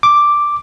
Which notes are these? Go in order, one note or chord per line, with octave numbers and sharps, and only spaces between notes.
D6